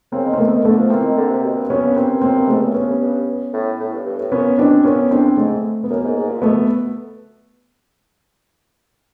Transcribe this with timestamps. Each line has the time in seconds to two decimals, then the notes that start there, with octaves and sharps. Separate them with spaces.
0.12 C#3 A#3 C4
0.25 D#3
0.34 C4
0.38 D#3 A3 B3
0.52 D#3
0.64 D3 A3 B3
0.78 F3
0.90 E3 A#3 C4
1.04 D#3
1.17 D3
1.30 C3
1.44 B2
1.56 G2
1.69 F#2 B3 C#4
1.81 G2
1.96 A#3 C4
2.22 F#2 A#3 C4
2.36 G2
2.48 G#2 A3 B3
2.57 G2
2.62 F#2
2.74 G2 B3 C#4
3.01 G2
3.53 A2
3.80 A2
3.93 G2
4.06 G2
4.19 A2
4.32 A#2 B3 C#4
4.58 B2 C4 D4
4.84 A#2 B3 C#4
5.11 A2 C4 D4
5.37 G#2 A3
5.84 B3
5.90 F#2 A#3
6.03 G#2
6.16 G#2
6.29 A#2
6.42 B2 A3 B3